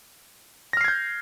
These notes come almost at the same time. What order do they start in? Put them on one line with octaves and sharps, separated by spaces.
A#6 F6 C7 G#6 G6